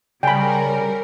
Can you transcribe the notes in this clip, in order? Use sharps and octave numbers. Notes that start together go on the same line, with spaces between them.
C#3 G3 A#4 D5 G5 G#5 B5